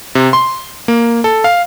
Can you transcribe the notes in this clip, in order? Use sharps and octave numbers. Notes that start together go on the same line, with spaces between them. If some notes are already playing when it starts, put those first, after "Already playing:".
C3
C6
A#3
A4
F5